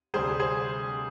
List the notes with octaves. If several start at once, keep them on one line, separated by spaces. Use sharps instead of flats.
D2 C3 G3 C4 G#4 C5
G#4 C5